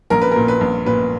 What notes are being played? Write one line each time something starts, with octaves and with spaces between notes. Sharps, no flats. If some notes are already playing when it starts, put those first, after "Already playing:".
A#1 A#4
B4
A#4
A#2
B4
A#1
A#2 B4